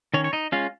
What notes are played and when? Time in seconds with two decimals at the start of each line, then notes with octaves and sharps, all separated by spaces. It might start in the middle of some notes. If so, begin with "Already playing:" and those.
0.14 D#3 C#4 C#5
0.24 C#5
0.33 D#4 D#5
0.52 G#3 C#4 F4 F5